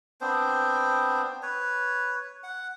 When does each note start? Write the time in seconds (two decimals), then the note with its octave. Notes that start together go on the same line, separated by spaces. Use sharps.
0.21 B3 C4 D4 C5
1.43 B4 C#5
2.43 F#5